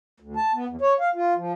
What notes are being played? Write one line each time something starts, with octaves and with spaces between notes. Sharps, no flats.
D2
A5
B3
E2
C#5
F5
F4
F3